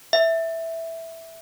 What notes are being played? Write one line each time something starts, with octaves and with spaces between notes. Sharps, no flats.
E5